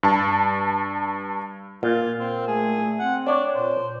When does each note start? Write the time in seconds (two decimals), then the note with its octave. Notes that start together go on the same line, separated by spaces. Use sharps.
0.03 G2 A5
1.83 A#2 F4
2.19 C4
2.48 A3 G#4
3.00 C4 F#5
3.27 D4 C#5 D5
3.55 A#2 C5